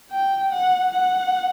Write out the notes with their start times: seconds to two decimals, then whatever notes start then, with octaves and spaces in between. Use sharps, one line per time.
0.11 G5
0.52 F#5
0.92 F#5